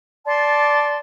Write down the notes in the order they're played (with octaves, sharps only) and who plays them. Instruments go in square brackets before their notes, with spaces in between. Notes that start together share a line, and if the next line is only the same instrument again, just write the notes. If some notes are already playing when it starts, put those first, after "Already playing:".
[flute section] D5 A5 C6